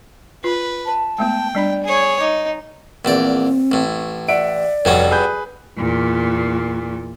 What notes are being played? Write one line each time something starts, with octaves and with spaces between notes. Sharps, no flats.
F4 B4
A5
G#3 A3 B3 G5
G3 D4 D5 B5
G#4 C#5
D#4 D#5 D6
A#1 E2 C4 D5
A1 A2
D5 E5 F#5 D7
F1 G2 F#3 C#4
G#4 B4 G6
E2 A#2